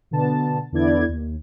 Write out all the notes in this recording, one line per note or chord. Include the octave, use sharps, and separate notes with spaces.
B2 D3 B3 A5
E2 D3 B3 E4 D5 G#6
D#2